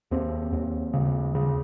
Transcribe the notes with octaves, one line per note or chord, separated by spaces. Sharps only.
D#2 C4
D#2
C#3
C#3